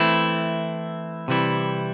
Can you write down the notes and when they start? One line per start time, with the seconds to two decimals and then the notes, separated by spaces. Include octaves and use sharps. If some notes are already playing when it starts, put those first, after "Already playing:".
Already playing: E3 A3 C4 E4
1.28 C3 E3 G3 E4